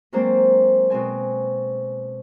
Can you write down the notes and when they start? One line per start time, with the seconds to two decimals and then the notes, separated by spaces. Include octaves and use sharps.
0.13 F#3 G#3 A#3 C4 C5 D5
0.90 B2 G#3 C4 G#5